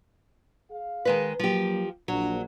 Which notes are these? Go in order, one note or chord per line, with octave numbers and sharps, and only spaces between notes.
G#4 F5
D#3 G#3 B4
F3 F#3 A#3 G4
A#1 F#3 D4